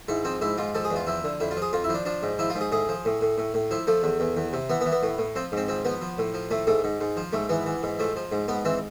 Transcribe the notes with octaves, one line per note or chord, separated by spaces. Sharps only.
G#2 E4
F3 C4
G#2 E4
G#2 F4
F3 A4
G#4
E2
F4
F3 E4
D3
F2 E4
F4
F3
G#4
F2 F4
E4
F3
D4
F3 D4
G#2
F3 E4
F4
G#2
G#4
A2 G#4
F3
A2
A2
A2
A2
F3 E4
F3 A3
E2
E2
E2
C3
E3 B3
B3
E3
B3
A2
A2
F3 C4
G#2 C4
F3 C4
F3 B3
F3
A2
F3
A2 A3
G#2 A3
G#2
G#2
F3
G#2 A3
E3 B3
E3
G#2
F3 A3
F3
G#2
G#2 B3
E3 C4